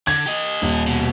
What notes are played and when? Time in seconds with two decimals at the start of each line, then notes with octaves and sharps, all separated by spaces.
0.07 D3 G#6
0.26 G4 D#5
0.62 D#1
0.87 B2